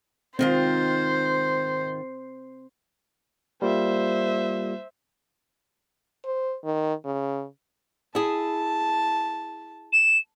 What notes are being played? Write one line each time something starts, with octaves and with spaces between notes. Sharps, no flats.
G#2 D#3 C4 F4 C5
G3 A#3 F4 C5 E5
C5
D#3
C#3
E4 G#4 A5
E7